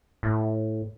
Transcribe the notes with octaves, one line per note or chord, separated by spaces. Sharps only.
A2